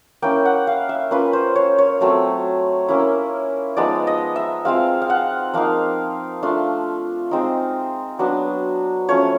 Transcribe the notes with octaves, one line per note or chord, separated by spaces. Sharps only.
A#3 C#4 E4 G5
F#5
F5
E5
A#3 C#4 F4 B4
C5
C#5
C#5
F#3 A3 C4
A#3 C#4 E4
F3 G#3 B3 D#4 D5
D#5
E5
G#3 C4 F4 F5
F5
F#5
F3 A#3 D#4 F5
A3 D4 F4
G#3 C4 D#4
F#3 B3 D4
F3 A3 C#4 C#5